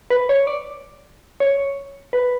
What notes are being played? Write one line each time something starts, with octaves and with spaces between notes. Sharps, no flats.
B4
C#5
D5
C#5
B4